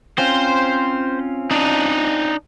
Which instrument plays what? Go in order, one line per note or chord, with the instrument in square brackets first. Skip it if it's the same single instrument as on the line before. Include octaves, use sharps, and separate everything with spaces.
[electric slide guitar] C4 C#4 F4 [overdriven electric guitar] C5
[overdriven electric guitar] D4 D#4